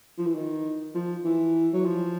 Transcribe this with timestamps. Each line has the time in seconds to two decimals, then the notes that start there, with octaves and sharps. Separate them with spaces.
0.18 F3
0.26 E3
0.35 D#3
0.95 F3
1.25 E3
1.73 F#3
1.85 F3